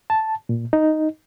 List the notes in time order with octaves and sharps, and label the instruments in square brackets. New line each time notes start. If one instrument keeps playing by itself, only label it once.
[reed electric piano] A5
A#2
D#4